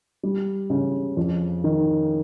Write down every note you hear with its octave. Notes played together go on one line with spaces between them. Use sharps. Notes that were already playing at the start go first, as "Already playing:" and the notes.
G3
C#3
F2
D#3